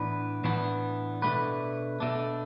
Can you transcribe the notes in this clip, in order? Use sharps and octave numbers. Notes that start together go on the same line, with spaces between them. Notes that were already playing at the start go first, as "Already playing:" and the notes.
Already playing: A2 E3 B3 D4 B4
A2 E3 B3 D4
B2 A3 D4 B4
B2 A3 D4